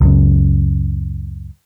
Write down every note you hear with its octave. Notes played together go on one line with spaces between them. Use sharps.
C#2 F#2 C#3